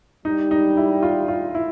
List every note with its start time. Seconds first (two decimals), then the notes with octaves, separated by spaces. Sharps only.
0.25 G3 D#4
0.51 D#4
0.77 E4
1.02 F4
1.28 F4
1.55 E4